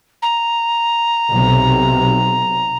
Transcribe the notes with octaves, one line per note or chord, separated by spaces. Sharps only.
A#5
B1 C3